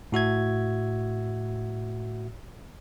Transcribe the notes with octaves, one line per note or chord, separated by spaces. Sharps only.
A2 F#4 E5 G#6